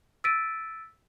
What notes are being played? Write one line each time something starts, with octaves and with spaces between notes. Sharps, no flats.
E6 A6 B6 D7 D#7